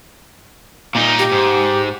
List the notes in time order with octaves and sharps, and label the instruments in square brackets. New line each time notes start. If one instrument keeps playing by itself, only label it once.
[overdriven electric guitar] A#2 D#4
[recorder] G4
[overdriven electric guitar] G#2